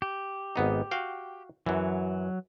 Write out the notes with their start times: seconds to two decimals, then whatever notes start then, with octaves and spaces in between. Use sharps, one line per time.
0.02 G4
0.56 G#1 B3 D#4
0.91 F#4 F5 G5
1.66 F#2 E3 F#3